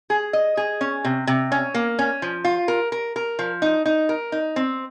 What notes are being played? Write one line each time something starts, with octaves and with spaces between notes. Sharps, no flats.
G#4
D#5
G#4
C#4
C3
C3
C#4
A#3
C#4
F3
F4
A#4
A#4
A#4
F3
D#4
D#4
A#4
D#4
C4